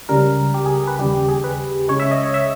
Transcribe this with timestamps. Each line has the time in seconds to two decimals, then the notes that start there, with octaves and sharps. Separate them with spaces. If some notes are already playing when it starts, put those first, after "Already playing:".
0.09 C#2 C#3 G3 A#4
0.54 G4
0.66 G#4
0.87 B4
0.99 D#2 C#3 G3 G4
1.14 G4
1.28 G#4
1.44 B4
1.88 C#2 C#3 G#3 C#5
2.00 E5
2.11 D#5
2.23 C#5
2.34 E5